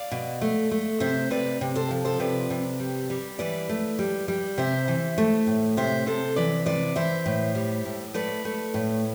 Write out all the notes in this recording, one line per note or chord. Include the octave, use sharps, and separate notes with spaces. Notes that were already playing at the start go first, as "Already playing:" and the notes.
Already playing: D5 F5
B2
A3
A3
C3 C5 E5
C3 B4 D5
C3
A4 C5
F3
A4 C5
C3 B4 D5
C3
G3
G3
E3 B4 D5
A3
G3
G3
C3 C5 E5
E3
A3
A2
C3 C5 E5
C3 A4 C5
E3 B4 D5
C3 B4 D5
E3 C5 E5
A2
G3
A2
A3 B4 D5
A3
A2